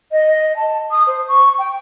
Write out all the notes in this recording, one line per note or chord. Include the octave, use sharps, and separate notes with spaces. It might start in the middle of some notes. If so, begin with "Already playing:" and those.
D#5
A5
D#6
C5
C#6
G5